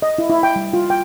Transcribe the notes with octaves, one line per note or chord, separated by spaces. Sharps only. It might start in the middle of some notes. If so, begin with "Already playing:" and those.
D#5
E4
E4
G5
G3
F4
G5